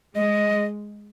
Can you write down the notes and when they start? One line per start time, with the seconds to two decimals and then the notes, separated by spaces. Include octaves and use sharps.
0.15 G#3 D#5